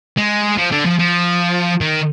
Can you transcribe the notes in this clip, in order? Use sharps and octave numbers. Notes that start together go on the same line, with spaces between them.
G#3
F3
D3
F3
F3
D#3